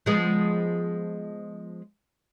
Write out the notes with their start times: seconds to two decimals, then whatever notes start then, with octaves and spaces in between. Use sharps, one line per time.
0.06 F3 G#3 B3